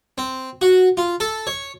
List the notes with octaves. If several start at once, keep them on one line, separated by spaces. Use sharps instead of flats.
C4
F#4
F4
A4
C#5